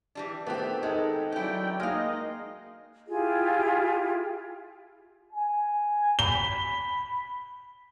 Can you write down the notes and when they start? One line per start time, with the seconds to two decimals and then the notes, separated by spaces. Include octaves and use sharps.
0.15 E3 G3 D4
0.47 D#3 A3 B3 C4 G4
0.83 G#3 D#4 A4
1.32 F#3 C#4 E4 D5 G5
1.80 G#3 A#3 D#4 D#5 F5 F6
3.08 E4 F4 G4 G#4
5.33 G#5
6.19 B5 G7